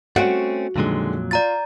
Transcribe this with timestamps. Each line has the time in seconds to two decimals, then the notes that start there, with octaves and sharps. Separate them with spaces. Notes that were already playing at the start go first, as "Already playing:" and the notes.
0.16 A3 C4 C#4 F#4 C#7 D7
0.76 F2 A#2 D3 D#3 F#3 G#3
1.31 F4 D5 A#5 A6